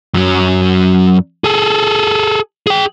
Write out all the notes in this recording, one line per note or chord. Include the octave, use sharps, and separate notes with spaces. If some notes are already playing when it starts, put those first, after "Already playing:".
F#2 F#3
G#4 A4
G#4 G5